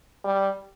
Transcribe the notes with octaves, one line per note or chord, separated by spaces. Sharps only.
G3